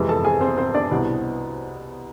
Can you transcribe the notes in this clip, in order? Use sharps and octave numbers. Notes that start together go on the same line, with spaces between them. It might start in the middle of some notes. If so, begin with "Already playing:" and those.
Already playing: F2 C3 E3 G#3
A4 A5
G#4 G#5
C4 C5
C4 C5
D4 D5
C2 B2 B3